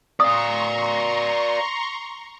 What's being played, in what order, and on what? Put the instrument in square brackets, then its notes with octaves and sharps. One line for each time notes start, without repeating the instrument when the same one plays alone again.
[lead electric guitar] D5 F5 [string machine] A#5 C6 C#6 [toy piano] D#6